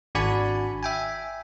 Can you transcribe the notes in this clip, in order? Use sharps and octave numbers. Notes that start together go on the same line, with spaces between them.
G#1 D4 F#4 D5 G#5 B5
E5 G5 G#5